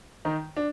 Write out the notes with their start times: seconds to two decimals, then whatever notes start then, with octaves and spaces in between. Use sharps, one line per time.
0.25 D#3 D#4
0.57 D4